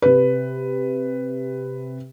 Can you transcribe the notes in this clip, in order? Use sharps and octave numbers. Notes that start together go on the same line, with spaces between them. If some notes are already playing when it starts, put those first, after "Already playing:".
C3 B4